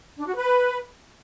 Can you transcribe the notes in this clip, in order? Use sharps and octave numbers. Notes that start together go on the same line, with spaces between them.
D4
F#4
B4